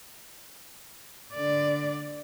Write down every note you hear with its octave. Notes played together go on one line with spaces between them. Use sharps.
D3 D5